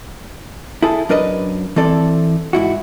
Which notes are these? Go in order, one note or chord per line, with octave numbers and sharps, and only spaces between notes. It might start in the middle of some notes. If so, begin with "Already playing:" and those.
E4 G#4 A4
F#2 D4 A#4 B4 D#5
E3 C4 A4 D5
G#2 E4 F#4